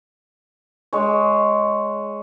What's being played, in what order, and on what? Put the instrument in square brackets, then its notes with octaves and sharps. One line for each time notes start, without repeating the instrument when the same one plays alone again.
[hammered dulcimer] G#3 C#5